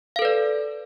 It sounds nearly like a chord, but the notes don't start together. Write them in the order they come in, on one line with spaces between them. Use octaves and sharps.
F5 A4 B4 D5